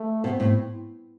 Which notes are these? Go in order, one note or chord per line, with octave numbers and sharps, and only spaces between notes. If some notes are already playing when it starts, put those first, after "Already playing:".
Already playing: A3
B2 C4
A2